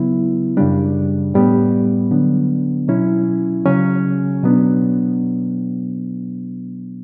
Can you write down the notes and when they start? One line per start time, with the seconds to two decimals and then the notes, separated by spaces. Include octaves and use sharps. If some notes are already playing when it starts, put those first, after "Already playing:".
Already playing: C#3 F#3 B3 E4
0.57 F#2 C#3 G3 D4
1.34 A2 G3 B3
2.10 D3 F#3 B3 D4
2.88 B2 F#3 C#4 E4
3.66 C#3 F#3 C#4
4.43 B2 F#3 B3 D4